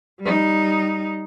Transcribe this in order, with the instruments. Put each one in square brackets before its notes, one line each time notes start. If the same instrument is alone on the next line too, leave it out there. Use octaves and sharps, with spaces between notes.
[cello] G3 D#4